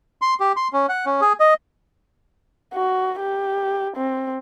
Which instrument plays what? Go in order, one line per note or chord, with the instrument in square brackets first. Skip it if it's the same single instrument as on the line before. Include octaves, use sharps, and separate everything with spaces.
[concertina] C6
G4
C6
C#4
F#5
C#4
G#4
D#5
[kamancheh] F#4
G4
C4